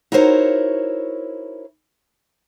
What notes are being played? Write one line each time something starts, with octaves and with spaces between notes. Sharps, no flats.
D#4 E4 F#4 A#4 C5 C#5